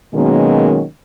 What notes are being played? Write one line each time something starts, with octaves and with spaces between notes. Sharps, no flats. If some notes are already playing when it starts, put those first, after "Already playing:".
B2 D#3 F#3 G#3 A#3 C#4